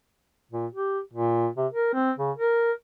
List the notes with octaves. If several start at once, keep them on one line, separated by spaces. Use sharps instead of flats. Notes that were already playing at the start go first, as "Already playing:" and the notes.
A#2
G4
A#2
C3
A#4
C4
C#3
A#4